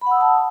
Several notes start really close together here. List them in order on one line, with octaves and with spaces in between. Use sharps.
B5 F#5 E6 D#6 A5